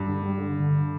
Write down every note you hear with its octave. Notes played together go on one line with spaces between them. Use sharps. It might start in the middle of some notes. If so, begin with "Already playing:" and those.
Already playing: G2
D3
G3
D3
D3